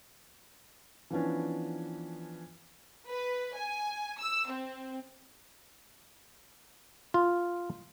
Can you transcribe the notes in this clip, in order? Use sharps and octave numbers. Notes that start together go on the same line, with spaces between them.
E3 F3 B3 C#4 D4
B4
G#5
E6
C4
F4